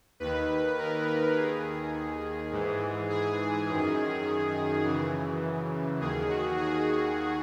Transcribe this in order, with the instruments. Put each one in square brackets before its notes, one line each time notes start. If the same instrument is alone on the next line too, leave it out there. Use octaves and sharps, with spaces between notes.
[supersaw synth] D#2 D#3 B4
A#4
A#4
D#2 D#3 G#4
G#2 E3
G#4
F#2 D#3
F#2 C#3 E3
D#2 D#3 G#4
F#4
G#4